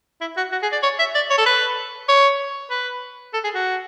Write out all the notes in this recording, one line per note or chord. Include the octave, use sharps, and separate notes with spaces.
E4
F#4
F#4
G#4
D5
C#5
E5
D5
C#5
A4
B4
C#5
B4
A4
G#4
F#4